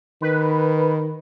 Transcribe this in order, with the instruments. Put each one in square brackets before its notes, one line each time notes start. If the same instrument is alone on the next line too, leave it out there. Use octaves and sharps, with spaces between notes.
[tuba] D#3 [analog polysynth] B4